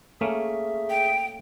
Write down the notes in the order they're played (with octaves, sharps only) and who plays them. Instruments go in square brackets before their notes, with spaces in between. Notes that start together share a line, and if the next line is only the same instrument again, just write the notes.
[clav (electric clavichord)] A3 A#3 C#4 [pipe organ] G#4 E5
[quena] G5